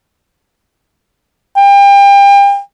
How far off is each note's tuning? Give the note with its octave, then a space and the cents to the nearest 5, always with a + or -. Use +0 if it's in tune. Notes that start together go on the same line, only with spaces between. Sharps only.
G5 +35